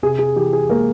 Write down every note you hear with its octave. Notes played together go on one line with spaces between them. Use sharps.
C3 G#4
G#4
E3 G4
G#4
G#3 A#3 A#4